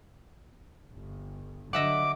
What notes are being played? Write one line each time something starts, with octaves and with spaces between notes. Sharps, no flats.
G1
D3 F#3 D#5 E5 F#5 D6